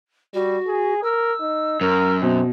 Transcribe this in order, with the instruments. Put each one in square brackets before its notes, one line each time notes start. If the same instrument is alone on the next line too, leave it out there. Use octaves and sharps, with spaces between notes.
[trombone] G3 [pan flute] F#4
[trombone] G#4
[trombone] A#4 [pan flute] E6
[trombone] D#4
[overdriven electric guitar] F#2 [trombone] A#4
[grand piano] B2 [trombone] C4